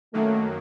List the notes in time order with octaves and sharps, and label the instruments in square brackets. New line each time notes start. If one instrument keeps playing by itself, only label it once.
[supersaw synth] F#2 D#3 F#3 A#3 [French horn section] A3